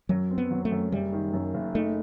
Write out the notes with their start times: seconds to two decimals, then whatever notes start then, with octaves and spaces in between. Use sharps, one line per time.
0.09 F#2 F#3
0.30 C4
0.38 B3
0.51 F#3
0.65 A3
0.72 F#2
0.92 F#1 G3
1.13 D#3
1.33 F#2
1.54 F#1
1.75 A3 D#4